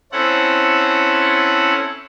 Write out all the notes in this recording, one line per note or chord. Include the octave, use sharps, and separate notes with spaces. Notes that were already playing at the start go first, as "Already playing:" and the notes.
C4 C#4 E4 A4 F#5